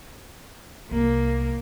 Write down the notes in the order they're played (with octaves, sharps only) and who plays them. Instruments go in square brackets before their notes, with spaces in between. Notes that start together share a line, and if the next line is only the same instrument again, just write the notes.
[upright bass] C2 [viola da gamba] A#3